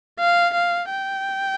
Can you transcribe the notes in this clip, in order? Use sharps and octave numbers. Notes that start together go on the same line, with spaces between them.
F5
F5
G5